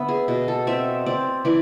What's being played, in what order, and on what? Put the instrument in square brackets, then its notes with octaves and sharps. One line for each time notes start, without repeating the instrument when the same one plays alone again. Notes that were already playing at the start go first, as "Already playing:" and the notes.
Already playing: [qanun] D3 B3 E5
G#4
B2
A4
C4 E5
C4 D5
E3 D5